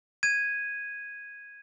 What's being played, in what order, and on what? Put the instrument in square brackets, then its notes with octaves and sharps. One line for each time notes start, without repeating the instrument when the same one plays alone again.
[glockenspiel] G#6 D#7